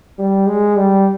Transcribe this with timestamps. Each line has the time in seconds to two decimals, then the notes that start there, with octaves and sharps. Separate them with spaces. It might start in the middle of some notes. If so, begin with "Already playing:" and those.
0.19 G3
0.47 G#3
0.76 G3